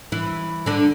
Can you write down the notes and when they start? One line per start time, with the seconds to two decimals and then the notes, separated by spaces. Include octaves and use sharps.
0.12 E3 E4
0.66 D3 D4